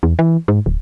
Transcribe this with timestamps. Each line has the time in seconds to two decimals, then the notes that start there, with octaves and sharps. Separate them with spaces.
0.03 E2
0.19 E3
0.48 G#2
0.66 D1